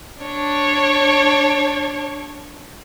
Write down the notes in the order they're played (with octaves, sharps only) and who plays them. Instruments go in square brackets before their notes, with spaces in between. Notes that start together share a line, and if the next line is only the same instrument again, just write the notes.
[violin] D4 C#5